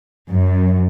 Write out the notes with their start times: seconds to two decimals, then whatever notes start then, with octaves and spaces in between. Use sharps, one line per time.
0.29 F#2